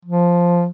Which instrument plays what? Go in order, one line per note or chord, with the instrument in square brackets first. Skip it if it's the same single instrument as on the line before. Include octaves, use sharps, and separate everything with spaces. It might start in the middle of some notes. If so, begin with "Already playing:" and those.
[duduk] F3